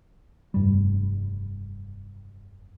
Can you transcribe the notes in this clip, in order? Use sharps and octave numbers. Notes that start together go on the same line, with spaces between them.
F1 G2 G3